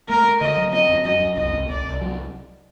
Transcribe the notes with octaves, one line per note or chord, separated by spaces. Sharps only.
A3 A#4
A3
D3 D#5
F#3
C4 D#5
F#2
F#3 D#5
F#2
C2 D#5
C2
C2 D5
C2
F#3